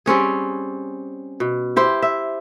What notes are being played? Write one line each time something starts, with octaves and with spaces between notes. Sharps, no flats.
G3 C4 C#4 G#4
B2
E4 G4 C5
E5